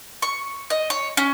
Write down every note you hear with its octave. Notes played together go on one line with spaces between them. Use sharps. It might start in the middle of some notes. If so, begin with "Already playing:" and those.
C#6
D#5
C#5
C#4